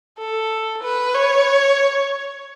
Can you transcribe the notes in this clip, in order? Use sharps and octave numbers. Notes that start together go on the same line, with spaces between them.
A4
B4
C#5